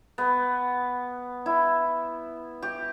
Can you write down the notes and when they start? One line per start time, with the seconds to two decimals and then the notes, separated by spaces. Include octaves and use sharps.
0.18 B3
1.46 E4
2.62 G4